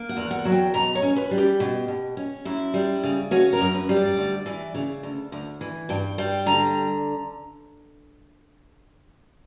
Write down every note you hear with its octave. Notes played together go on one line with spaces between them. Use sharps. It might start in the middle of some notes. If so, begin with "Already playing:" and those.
Already playing: A#3
F#5
E2
F#5
F#3
G5
B2 A#5
C#5
C#4
B4
G3
G4
B2
B2
C#4
F#2 E4
G3
C#3
C#4 F#4
A#4
F#2
B4
G3
D5
D2
E3
C#3
D2
D2
E3
G2 G5
G3 G5
D3 A#5